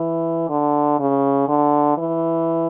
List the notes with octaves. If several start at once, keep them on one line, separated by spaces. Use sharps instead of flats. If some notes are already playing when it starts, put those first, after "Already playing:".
Already playing: E3
D3
C#3
D3
E3